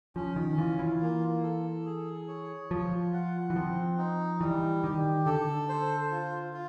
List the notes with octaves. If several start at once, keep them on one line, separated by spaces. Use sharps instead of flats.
F3 C#4
D#3
E3 F4
E3
A#3
A4
G#4
C#5
F3 F4
F#5
E3
F3 C4
D#4
E3 G3
D#3 G4
D3 A4
C5
F4
F4